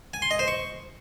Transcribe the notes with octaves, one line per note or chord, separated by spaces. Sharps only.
G#5
C6
D#5
C5
C#6